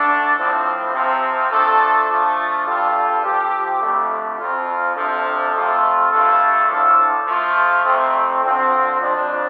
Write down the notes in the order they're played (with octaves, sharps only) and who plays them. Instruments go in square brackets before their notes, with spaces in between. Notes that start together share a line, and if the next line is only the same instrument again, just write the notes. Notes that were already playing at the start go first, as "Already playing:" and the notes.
Already playing: [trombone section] D3 A3 D4 A4
A2 F3 C4
C3 F3 C4
F3 A3 D4 A4
F3 A3 D4 F4
G2 G3 F4 A4
F3 C4 G4
F2 D3 A3
F2 F3 C4 F4
C3 F3 D4 A4
F2 C3 A3 F4 A4
G2 D3 A3 F4 A4
A2 F3 D4 F4 A4
F3 A3 F4
F2 C3 A3 C4
D3 F3 C4 F4
F2 F3 D4